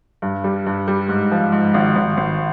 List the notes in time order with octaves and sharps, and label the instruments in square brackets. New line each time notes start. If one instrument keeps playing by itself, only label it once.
[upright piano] G2
G3
G2
G3
G#2
F3
G#2
G#1
G#1
G#1